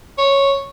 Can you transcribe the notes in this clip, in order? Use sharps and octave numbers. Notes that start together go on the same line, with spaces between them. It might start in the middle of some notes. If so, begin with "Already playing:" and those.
C#5